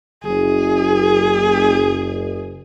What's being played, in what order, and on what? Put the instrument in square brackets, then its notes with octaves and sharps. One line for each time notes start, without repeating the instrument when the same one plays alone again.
[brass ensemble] F#1 [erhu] G#4